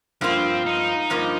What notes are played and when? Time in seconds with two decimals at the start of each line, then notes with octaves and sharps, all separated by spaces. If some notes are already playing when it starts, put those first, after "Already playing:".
0.21 G2 F3 A#3 C4 F4
0.66 D#4
1.10 G2 F3 A#3 F4